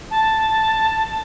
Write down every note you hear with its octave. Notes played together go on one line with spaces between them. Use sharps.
A5